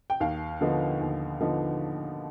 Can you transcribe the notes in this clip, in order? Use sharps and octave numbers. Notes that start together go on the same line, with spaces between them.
G5
D#2 F5
D3 F3 B3 D#4
D#2
D3 F3 B3 D#4